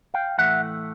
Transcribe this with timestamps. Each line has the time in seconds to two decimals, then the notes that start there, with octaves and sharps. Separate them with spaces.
0.14 F5 G5
0.38 A2 E3 A3 E5 F#5